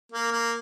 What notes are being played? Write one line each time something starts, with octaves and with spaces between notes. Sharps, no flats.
A#3
A#3